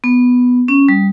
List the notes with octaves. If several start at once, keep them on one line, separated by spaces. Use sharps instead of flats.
B3
C#4
G3